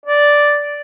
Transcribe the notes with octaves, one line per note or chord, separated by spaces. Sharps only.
D5